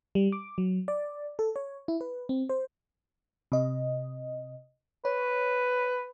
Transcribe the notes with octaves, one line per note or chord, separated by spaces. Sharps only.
G3
D6
F#3
D5
A4
C#5
E4
B4
C4
C5
C3 D#5
B4 C#5